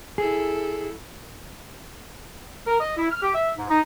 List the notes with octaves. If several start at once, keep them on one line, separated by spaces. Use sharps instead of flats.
E4 G#4 A4
A#4
D#5
E4
F6
G4
E5
G#2
D#4